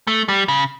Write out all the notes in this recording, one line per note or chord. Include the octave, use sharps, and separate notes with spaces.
A3
G3
C#3